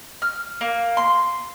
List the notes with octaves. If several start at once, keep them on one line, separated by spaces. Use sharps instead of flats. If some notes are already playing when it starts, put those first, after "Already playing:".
F6
A#3
C6